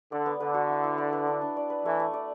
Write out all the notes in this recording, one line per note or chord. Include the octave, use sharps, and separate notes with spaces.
D3 D5
B3
D3 B4
F#4
E4
E4
D5
B4
D4
D4
D5
B4
E3 A3
A3
D5